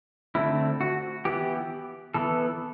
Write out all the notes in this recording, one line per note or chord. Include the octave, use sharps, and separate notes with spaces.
D3 A3 C4 E4
F#4
E3 B3 G4
E3 B3 A4